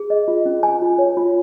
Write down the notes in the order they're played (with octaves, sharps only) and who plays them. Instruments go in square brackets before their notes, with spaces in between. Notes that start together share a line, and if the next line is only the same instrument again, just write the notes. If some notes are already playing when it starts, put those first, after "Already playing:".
Already playing: [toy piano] G#4
D#5
F4
C#4
G#5
F4
C#5
F4